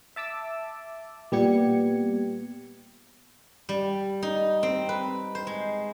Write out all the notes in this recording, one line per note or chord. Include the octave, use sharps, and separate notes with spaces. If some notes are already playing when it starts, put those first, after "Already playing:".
E5 A5 D6 E6
A#2 G3 B3 G4 G#6 C#7
G3
D#4
C4
B4
C5
G#3